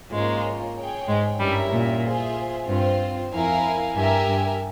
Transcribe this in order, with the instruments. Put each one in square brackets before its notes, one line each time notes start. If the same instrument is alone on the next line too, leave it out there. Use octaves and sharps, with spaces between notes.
[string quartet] G#2 G#3 [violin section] A#3 C#4 F4
[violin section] G#4 C#5 G5
[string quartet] G#2 G#3
[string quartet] G2 G3 [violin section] C#4 E4 G4 A#4 E5
[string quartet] A#2
[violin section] F4 G#4 C5 E5
[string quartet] G2 [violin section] C4 F4 C5
[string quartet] F2 [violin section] E4 A#4 F5 G#5
[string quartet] G2 [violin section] G4 A#4 E5 G#5
[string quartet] G2